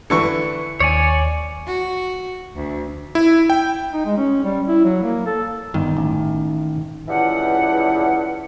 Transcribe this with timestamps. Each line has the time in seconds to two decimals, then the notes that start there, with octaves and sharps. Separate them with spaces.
0.10 D3 E3 C#6 C#7
0.80 D#2 C#5 D5 G#5
1.66 F#4
2.55 D2
3.15 E4
3.50 G5
3.93 D#4
4.05 G#3
4.17 C#4
4.44 G3
4.68 E4
4.84 F#3
5.03 A#3
5.26 A4
5.74 G1 D#3
5.97 A1
7.08 C#2 G2 E3 F#5